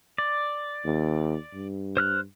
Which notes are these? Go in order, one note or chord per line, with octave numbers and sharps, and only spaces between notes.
D5
D#2
G2
C5 F6 F#6